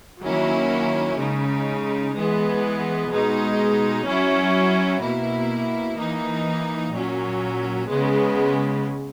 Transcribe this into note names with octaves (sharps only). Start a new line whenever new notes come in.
D#3 F#3 A#3 C#4 E4
C#3 G#3 D#4
E3 G#3 B3
B2 G#3 D#4
F#3 C#4 E4
B2 A#3 E4
E3 A#3 D#4
A#2 F#3 C#4
C#3 G#3 B3